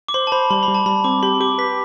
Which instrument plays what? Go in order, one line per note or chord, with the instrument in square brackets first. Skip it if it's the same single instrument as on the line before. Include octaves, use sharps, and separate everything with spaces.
[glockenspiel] D6
[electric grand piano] C5 [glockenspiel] C6
[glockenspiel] A5
[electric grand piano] C5 [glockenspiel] B5
[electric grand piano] G3 [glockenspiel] C6
[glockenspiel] B5
[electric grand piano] G3
[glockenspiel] A5
[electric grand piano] G3 [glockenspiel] B5
[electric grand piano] C4 [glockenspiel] D6
[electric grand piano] G4 [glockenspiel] C6
[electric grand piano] G4 [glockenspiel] D6
[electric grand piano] B4 [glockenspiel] B6